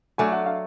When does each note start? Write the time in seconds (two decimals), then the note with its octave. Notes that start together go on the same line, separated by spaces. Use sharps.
0.18 F#3 A3 D4 G#5
0.32 F#5
0.46 F5